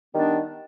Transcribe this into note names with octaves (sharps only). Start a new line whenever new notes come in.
D#3 G3 B3 D4